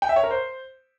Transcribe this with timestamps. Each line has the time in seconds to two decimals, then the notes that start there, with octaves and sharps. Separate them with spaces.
0.02 G5
0.09 E5
0.16 C#5
0.23 A#4
0.31 C5